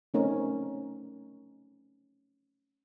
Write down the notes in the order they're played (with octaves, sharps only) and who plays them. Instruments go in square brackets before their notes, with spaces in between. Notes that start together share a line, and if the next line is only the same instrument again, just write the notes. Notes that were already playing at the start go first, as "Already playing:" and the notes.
[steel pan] A3 C4 C#4 D#4 A#4